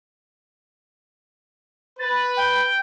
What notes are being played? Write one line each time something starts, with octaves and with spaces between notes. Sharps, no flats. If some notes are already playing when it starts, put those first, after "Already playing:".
B4 A6
G5